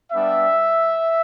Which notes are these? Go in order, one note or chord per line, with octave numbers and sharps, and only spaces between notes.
G3 B3 D4 E5